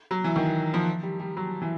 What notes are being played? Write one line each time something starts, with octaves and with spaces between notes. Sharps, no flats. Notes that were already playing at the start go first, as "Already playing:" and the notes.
F#3
E3
D#3
F3
G3
G3
F#3
E3